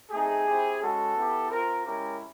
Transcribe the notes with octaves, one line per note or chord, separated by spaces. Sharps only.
A3 C4 D#4 G#4
C4 E4 G4
G#3 C#4 F#4 A4
B3 E4 G4
C4 F4 A#4
G#3 C#4 E4 G4 A#4